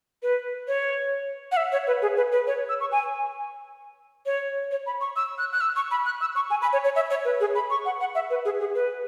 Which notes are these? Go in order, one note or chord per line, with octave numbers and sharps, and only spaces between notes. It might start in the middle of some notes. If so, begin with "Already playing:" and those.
B4
C#5
F#5
E5
C#5
B4
G#4
B4
B4
C#5
E6
C#6
G#5
C#5
C#5
B5
C#6
E6
F#6
F#6
E6
C#6
B5
F#6
E6
C#6
G#5
B5
C#5
C#5
E5
C#5
B4
G#4
B5
C#6
F#5
F#5
E5
B4
G#4
G#4
B4